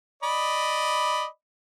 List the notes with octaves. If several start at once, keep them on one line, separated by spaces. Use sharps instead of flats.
D5 D#5 B5